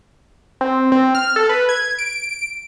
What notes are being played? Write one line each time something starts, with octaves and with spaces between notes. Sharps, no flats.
C4
C4
F6
A4
B4
G#6
D7